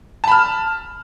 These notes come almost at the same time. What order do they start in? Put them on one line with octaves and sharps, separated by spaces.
A5 B5 F6